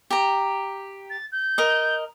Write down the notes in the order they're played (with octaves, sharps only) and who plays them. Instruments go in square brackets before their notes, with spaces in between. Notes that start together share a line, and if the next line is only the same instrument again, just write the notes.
[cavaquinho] G4 A#5
[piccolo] A6
G6
[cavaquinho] A#4 D#5